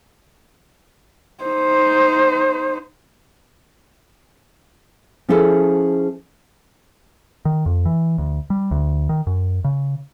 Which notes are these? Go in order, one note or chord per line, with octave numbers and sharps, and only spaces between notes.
D#4 C5
F3 C#4 E4 G#4 A4 C5
D#3
F2
E3
D2
G3
D2
D#3
F#2
C#3